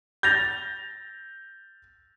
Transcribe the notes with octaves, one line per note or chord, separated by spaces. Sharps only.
G6 A6 A#6 F7